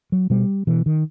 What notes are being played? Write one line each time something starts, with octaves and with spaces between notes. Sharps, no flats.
F#3
B2 G3
B2 E3
D#3